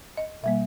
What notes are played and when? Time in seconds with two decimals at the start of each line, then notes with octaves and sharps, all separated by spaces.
0.17 D#5
0.43 B2 G3 A#3 E5